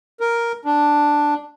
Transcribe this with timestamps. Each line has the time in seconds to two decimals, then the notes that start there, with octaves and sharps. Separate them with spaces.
0.20 A#4
0.65 D4